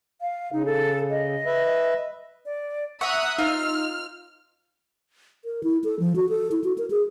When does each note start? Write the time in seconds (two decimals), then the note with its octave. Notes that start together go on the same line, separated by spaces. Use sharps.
0.21 F5
0.53 C#3 D#4
0.65 A4
1.10 D#5
1.46 B4 E5
2.45 D5
3.01 E5 F#5 A#5 C#6 D#6 E6 F#6
3.38 D#4 F4 C5 F6
5.45 A#4
5.63 E4
5.84 A4
6.00 F3
6.16 F#4
6.29 A4
6.52 E4
6.64 F#4
6.78 A#4
6.90 G#4